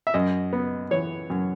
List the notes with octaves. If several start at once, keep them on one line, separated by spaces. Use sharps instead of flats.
E5
F#2 D#5
B3
E3 C#5
F#2